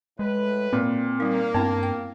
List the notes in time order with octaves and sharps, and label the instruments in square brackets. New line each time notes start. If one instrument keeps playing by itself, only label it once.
[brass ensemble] A2 B4 [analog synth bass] G#3
[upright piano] A#2 [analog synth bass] C4
[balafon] G3 D#4 [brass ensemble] A#3
[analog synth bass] G2 [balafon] B3 C4 E4 [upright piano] A5
[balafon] G5